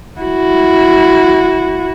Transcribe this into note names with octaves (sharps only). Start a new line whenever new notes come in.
E4 F#4